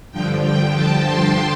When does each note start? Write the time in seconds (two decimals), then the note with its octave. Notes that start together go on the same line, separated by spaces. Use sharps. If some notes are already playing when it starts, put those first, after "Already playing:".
0.11 G2 D3 F3 G5
0.43 G5
0.74 A5
1.05 C6